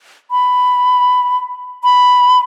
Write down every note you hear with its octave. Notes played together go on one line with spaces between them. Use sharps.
B5
B5